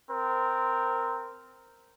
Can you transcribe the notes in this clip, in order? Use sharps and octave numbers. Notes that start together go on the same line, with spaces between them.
C4 A#4